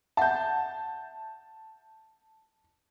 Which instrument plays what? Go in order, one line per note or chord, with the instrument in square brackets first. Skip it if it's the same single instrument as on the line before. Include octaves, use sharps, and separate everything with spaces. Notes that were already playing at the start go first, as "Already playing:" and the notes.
[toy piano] E5 F#5 [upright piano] A5 G6